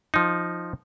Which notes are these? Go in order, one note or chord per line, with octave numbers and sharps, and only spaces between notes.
F3 D#4